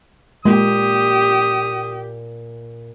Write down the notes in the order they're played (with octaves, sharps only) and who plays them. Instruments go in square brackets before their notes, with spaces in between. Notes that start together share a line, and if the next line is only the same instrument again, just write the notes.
[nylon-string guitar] A#2 A#3 [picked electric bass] G#3 [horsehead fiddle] G4 [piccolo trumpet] D#6